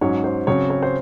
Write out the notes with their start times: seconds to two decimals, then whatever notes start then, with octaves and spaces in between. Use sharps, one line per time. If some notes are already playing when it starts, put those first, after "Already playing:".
0.01 G#2 F#3 C#4 C#5
0.24 C5
0.47 C#3 F#3 C4 C#5
0.70 C#5
0.83 C5